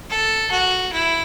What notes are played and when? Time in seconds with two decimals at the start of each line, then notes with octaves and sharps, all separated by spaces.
0.10 A4
0.51 F#4
0.93 E4